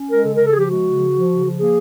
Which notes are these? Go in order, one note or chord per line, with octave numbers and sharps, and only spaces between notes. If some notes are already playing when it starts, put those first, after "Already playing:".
Already playing: C#4
G#3 A#4
C#3 A4
C#3 A#4
A4
F3 G4 G#4
G#3 F#4
C#3
F3
F3
C#3
F3
A#3 G#4